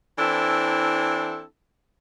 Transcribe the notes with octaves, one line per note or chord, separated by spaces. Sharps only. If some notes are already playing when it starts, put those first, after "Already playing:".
E3 C4 D4 E4 A4